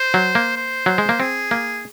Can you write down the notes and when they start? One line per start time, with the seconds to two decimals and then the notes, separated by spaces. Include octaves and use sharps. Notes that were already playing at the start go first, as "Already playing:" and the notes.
Already playing: C5
0.14 F#3
0.35 A#3
0.56 C5
0.86 F#3
0.98 G#3
1.09 A#3
1.20 C4 G#4
1.51 A#3